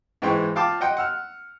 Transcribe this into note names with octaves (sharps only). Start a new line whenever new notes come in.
G#2 E3 G#3 G5 C6 C#6
F4 F5 G5 A5 D6
D#5 F#5 G5 C6
F#5 E6 F6